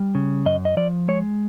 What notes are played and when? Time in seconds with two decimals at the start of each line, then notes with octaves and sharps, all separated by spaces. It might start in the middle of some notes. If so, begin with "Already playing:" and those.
Already playing: G3
0.15 C#3
0.46 F#2 D#5
0.65 D#5
0.77 F3 D5
1.08 G#3 C#5